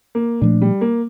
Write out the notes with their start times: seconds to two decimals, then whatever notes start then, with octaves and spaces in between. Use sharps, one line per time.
0.15 A#3
0.41 A#2 F3 A3 D4
0.62 G3
0.81 A#3